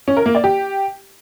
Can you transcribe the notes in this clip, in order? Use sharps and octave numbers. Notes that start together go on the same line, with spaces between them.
C#4
A#4
A#3
D5
G4